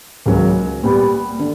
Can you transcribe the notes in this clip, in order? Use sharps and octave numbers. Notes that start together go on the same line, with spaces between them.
C#2 C#3 F#3 A#3
A#2 G3 B3
D3